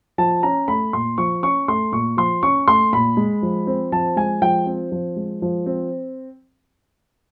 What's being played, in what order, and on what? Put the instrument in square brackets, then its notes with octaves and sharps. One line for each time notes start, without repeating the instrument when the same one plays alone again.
[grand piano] F3 A5
C#4 A#5
A3 B5
A#2 C6
F3 C#6
C#4 C#6
A3 C6
A#2 C#6
F3 C6
C#4 C#6
A3 C6
A#2 B5
G#3
F3
C4
F3 A5
G#3 G#5
F3 G5
C4
F3
G#3
F3
C4